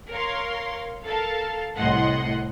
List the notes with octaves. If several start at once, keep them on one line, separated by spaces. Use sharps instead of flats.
A#4 C#5 F5 C6
A4 A#4 F5 A5
C2 A2 D#5 F#5 C6